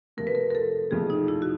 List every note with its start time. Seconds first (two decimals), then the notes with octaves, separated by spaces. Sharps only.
0.17 F2 C3 F3 A3 A#4
0.27 B4
0.35 A#4
0.50 A#4
0.55 A4
0.91 F2 C3 F3 A3 G#4
1.10 D#4
1.28 E4
1.42 F#4